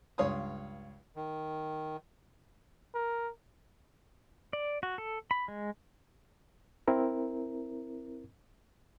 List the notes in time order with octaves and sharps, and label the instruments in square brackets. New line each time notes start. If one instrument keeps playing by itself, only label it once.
[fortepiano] C#2 G2 C#5 F5 C6 D#6
[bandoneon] D#3
[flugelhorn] A#4
[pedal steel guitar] D5
F#4
A4
B5
G#3
[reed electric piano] C4 E4 A#4